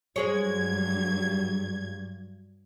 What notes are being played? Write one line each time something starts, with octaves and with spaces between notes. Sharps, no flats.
G2 F#3 G#3 G#4 C#5 G#6